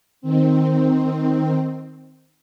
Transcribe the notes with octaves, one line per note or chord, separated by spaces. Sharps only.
D#3 C4